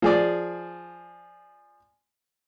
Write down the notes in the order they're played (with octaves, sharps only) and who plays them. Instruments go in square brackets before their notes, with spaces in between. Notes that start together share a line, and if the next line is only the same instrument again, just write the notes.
[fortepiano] F3 G#4 D5